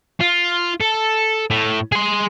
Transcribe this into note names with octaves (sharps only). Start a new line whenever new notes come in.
F4
A4
A2
G#4 C6